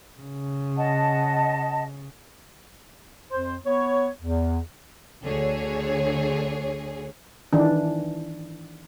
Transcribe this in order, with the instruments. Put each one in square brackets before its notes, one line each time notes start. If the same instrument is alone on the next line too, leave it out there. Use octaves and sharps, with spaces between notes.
[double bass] C#3
[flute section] D#5 F#5 A5
[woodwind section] F2 C5
B3 C#5
E2
[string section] D2 D3 G#4 C#5
[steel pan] D#3 E3 D4